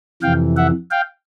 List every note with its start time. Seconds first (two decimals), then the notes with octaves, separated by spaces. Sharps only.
0.22 F2 C3 E3 F5 G5
0.57 E5 F#5
0.91 F5 G5